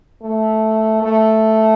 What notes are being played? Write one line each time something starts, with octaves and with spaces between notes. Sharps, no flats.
A3
A3